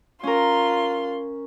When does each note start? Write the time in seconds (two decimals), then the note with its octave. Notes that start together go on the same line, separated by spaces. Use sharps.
0.23 C#4 F4 A#4 C6